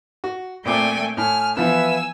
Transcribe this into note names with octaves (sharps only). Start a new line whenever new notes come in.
F#4
A#2 A3 C4 D5 G5 G#5 D6
A2 G#5 F6
E3 F3 B3 B4 E5 F5 G#5 E6